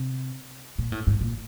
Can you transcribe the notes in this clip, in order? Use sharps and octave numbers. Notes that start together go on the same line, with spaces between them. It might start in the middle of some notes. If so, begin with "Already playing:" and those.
Already playing: C3
A#2
A2
G#2
A#2